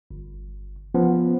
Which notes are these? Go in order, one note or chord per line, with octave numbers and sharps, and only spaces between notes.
G1
F3 B3 C#4